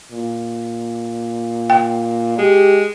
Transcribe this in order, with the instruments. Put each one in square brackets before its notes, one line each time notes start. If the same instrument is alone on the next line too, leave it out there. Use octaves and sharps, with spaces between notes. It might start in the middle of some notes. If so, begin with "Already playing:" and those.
[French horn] A#2
[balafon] G5
[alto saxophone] G#3 [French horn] G4